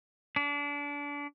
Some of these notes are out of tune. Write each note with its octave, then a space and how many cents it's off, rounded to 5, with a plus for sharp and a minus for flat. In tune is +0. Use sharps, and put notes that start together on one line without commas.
D4 -30